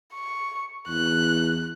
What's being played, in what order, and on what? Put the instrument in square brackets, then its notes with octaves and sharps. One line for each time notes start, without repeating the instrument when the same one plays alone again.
[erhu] C#6
[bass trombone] E2 [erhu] F#6